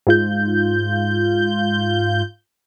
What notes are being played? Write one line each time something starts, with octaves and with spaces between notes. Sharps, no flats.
G#2 F4 G6